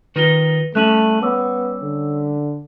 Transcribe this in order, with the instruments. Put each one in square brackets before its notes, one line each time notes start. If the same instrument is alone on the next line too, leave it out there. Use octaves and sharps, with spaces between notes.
[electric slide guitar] D#3 D#4 F4 [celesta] B4 A#6 G7
[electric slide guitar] G3 C#4 [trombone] A3 [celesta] F#6 D#7 F#7
[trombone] B3 [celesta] C#5 D6 E6
[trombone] D3